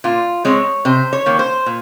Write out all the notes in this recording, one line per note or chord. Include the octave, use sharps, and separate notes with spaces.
A#2 F4
G#3 C4 C#5
C3 C5
C#5
D#3 A#3
C5
A#2